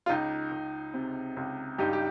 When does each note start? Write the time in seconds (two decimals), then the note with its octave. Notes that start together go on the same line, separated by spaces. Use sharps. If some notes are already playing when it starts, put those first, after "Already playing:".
0.06 F4
0.09 C#2 D#4
0.52 C#2
0.94 C3
1.37 C#2
1.78 G2 D#4 G4
1.93 G4